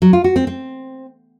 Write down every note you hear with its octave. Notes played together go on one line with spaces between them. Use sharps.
F#3
F4
F#4
C4
C4